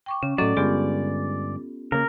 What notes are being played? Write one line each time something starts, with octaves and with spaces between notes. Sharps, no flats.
G5 C#6 D6
C#3 C#4
A2 F#3 C#4 A4 D5 D#5
G2 D3 G#3 B3 F4 G4
C#3 A#3 A#4